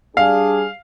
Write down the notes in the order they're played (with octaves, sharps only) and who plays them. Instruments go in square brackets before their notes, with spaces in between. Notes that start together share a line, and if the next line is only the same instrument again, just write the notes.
[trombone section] G3 D4 G#4 [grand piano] F5